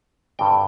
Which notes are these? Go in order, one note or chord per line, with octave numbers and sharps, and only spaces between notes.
G2 D3 G3 C4 G5